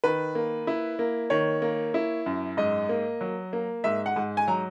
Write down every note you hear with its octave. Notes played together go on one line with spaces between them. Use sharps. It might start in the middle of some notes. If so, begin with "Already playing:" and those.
D#3 B4
A#3
E4
A#3
D#3 C#5
A#3
E4
F#2
G#2 D#5
A#3
F#3
A#3
G#2 E5
F#5
G#2
G#5
F#3 A#5